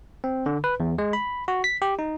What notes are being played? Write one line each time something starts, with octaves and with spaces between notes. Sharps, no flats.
C4
D3
B4
E2
G#3
B5
F#4
B6
G4
D#4